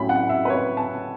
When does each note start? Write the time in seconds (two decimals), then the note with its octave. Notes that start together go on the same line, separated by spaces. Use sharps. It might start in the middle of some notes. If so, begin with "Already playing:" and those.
Already playing: A2 F#3 C#4 B5
0.09 F#5
0.29 E5
0.45 B4
0.50 C#5
0.77 A5